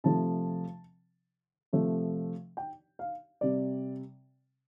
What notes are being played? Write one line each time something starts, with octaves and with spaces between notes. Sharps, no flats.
C3 F3 A3 A5
C3 F3 A3
G5
F5
C3 G3 D5